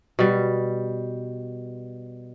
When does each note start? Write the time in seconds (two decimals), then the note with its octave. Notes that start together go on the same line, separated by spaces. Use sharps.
0.19 B2 G3